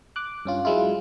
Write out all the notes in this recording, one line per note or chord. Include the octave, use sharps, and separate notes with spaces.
D6 F#6
G2 C#4 F4
F#3 G#3 E4 F4